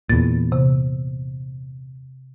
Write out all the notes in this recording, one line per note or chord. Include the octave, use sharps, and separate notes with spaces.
E2 A#2 A6
C3